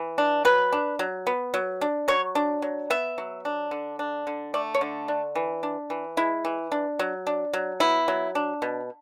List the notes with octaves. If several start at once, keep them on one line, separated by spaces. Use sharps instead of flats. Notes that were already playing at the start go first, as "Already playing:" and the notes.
Already playing: E3
D4
F#3 B4
D4
F#3
B3
F#3
D4
F#3 C#5
D4
F#3
B3 E5
F#3
D4
D3
D4
D3
A3 D5
C#5
D3
D4
E3
D4
E3
G#3 E4
E3
D4
F#3
D4
F#3
B3 E4
F#3
D4
B2